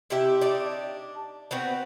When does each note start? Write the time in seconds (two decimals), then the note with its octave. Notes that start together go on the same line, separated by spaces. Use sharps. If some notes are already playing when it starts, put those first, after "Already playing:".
0.10 C3 E4 G4 E5
0.41 D4 D#4 D5
1.51 B3 C4 F#4 B4